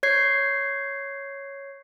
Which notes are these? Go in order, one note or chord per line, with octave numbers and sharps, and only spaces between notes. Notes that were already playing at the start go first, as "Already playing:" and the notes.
C#5 G#6 C7